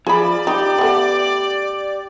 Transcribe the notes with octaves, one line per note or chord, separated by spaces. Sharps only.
F3 G#4 D5 B5
D#4 G4
A3 B3